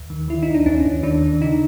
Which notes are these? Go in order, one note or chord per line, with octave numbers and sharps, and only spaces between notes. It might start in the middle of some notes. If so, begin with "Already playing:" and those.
Already playing: D#2
D#3
D#3 E4
D#4
D#2
D4
D#2 C#4
D#2
D#3 D4
D#3
C#3 D#4